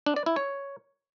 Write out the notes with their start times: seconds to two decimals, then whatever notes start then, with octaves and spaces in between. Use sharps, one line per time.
0.06 D4
0.16 D5
0.26 E4
0.36 C#5